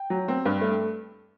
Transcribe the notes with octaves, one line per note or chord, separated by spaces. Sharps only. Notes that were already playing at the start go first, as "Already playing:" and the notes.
Already playing: G5
F#3
C4
G2
A3